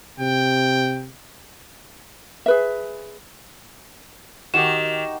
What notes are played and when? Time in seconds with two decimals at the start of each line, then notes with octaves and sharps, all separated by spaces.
0.20 C3 G5
2.46 G#4 B4 E5
4.54 D#3 F#4 G4 D#5 E7